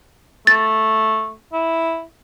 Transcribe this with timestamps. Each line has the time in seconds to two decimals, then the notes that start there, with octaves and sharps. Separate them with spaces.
0.47 A3 A6
1.52 E4